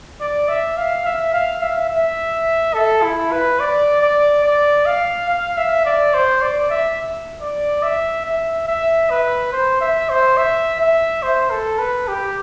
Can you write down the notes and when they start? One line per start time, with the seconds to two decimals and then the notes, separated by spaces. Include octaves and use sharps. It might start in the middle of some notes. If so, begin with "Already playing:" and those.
0.21 D5
0.48 E5
0.77 F5
1.05 E5
1.33 F5
1.62 E5
1.90 E5
2.74 A4
3.03 E4
3.32 B4
3.60 D5
4.02 D5
4.45 D5
4.86 F5
5.30 F5
5.58 E5
5.86 D5
6.14 C5
6.42 D5
6.70 E5
7.41 D5
7.83 E5
8.26 E5
8.68 E5
9.10 B4
9.53 C5
9.81 E5
10.10 C5
10.37 E5
10.80 E5
11.23 C5
11.51 A4
11.79 B4
12.08 G4